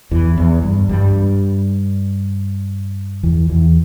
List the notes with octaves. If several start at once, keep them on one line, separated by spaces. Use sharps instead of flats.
E2 E3
E2
G2
G2 G3
E2 E3
E2 E3